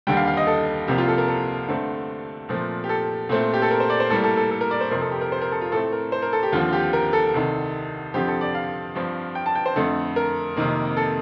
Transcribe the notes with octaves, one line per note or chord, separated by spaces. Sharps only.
D#2 D3 G3 G5
F5
F5
D#5
A4
C2 C3 F3 A#3 G4
F4
A4
A#4
A4
G2 D3 A3 C4
A#2 F3 A3 C4
G4
A4
A#2 A3 C4
G4
A4
A#4
C5
D5
C5
A2 G3 A#3 A4
A4
A4
A4
A#4
D5
C5
F2 C3 F3 C4 A#4
A4
G4
A#4
C5
A#4
A4
F4
A2 A3 C4 A4
A#4
C5
A#4
A4
G4
D#2 D3 F3 C4 F4
G4
A#4
A4
C2 C3 D#3
F2 D3 F3 C4 G4
A4
D5
F5
G2 F3 C4
G5
A5
G5
C5
F2 D3 A3 A4
A#4
F2 C3 D#3 A#3
A4